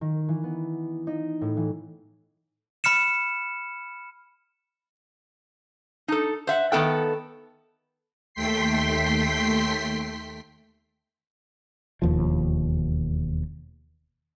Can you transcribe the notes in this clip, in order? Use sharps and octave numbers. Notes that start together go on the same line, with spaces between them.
D#3
E3
B3
D#4
A2
E3
B5 F6 C#7 E7
D#4 A4
C5 E5 F#5
D#3 B3 A4 G5
D#2 A3 G5 C6 B6 C7
E1 D#2 F3